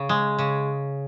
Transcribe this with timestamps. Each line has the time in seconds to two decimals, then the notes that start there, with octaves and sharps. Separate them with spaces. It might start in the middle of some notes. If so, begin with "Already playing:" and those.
Already playing: C#3
0.09 G#3
0.39 C#3